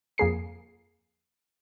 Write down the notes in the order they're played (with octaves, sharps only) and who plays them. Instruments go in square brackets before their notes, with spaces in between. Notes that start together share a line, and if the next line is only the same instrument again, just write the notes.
[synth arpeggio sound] F2 A#3 G#4 C7